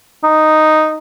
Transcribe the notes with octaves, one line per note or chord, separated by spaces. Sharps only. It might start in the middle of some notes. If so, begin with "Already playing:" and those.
D#4